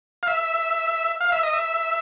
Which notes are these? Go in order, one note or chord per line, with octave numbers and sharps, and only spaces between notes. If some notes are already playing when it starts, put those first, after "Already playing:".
F5
E5
F5
E5
D#5
E5